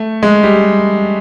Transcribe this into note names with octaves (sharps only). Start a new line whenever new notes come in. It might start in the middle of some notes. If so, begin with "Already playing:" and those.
Already playing: A3
G#3
G3